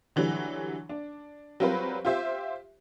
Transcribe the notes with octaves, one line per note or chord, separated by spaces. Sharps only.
D3 E3 F#3 G3
D4
F#3 G3 C4 F4 A#4 B4
F4 G4 C5 E5